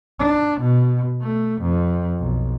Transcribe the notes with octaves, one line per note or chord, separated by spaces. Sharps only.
D4
B2
A3
F2
B1